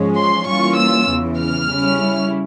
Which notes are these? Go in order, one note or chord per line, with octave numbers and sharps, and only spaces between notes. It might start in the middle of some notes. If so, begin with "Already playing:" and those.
Already playing: G#2 F3 G#3 C#4
C6
E3 G3 A#3 C#4 F4 C#6
E6
E2 C#3 E3
F6
C#3 G3 C#4 E4